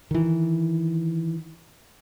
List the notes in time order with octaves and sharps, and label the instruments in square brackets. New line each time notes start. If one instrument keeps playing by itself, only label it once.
[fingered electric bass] D#3 E3